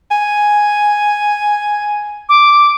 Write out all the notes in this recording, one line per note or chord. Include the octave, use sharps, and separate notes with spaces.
G#5
D6